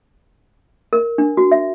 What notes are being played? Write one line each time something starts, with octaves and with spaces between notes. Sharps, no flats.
A#4
D4
F#4
E5